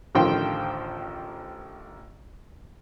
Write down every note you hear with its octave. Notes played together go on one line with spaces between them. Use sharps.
A1 D3 D#3 F3 G5 C6